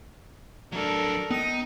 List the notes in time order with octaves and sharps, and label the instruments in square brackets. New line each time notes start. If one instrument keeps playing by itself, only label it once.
[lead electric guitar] F#3 D4 [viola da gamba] A4 A#4
[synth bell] B3 D#7 [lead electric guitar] D#4